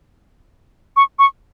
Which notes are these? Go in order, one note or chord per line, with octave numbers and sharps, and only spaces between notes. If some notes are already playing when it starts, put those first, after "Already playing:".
C#6
C#6